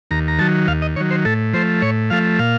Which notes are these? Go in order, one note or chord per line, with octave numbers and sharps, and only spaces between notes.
D#2 A#5
A#5
D#3 F#3 A5
D#2 F5
D#5
D#3 F#3 C#5
C5
A2 A4
F3 A3 C5
A2 C#5
F3 A3 F5
A#2 F5